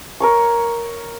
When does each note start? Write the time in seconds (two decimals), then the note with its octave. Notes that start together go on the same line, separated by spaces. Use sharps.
0.20 A#4 C#5 C#6